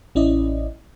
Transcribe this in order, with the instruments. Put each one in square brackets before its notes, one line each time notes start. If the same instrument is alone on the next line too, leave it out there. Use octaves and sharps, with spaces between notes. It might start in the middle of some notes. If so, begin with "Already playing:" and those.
[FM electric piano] A1 C#4 E4 D5 D#5